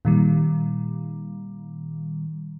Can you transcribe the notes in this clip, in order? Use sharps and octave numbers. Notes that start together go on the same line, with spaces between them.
A#2 D#3 G3